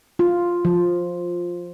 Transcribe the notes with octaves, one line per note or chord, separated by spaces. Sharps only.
F4
F3